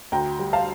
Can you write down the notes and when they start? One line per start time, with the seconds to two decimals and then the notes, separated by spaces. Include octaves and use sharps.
0.12 D2 G5 A#5
0.39 G3
0.53 F5 A5